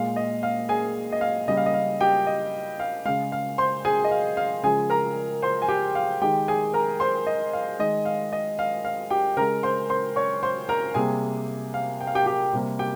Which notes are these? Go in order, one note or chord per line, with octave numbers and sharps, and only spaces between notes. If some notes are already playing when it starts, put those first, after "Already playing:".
Already playing: A#2 G#3 F5
D#5
F5
G#4 G#5
D#5
F5
C#3 G3 A#3 D#5
F5
D#5
F5
G4 G5
D#5
F5
C#3 G#3 F5
F5
C5 C6
G#4 G#5
D#5
F5
F5
C#3 F3 G#3 G#4 G#5
A#4 A#5
C5 C6
G#5
G4 G5
F5
D#3 G#3 G4 G5
G#4 G#5
A#4 A#5
C5 C6
D#5
F5
D#3 G#3 D#5
F5
D#5
F5
F5
G4 G5
C#3 G#3 A#4 A#5
C5 C6
C5 C6
C#5 C#6
C5 C6
A#4 A#5
C3 G3 A#3 G#4 G#5
F5
G5
F5
G4 G5
G4 G5
C3 G3 A#3
G4 G5